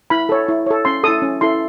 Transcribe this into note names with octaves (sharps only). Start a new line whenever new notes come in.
E4 B5
A4 C#5
E4
A4 C#5
C#4 C6
E4 A4 D#6
C#4
E4 A4 C6